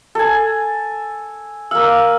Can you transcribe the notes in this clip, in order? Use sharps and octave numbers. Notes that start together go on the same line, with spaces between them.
A4 G#5
A#3 F5 E6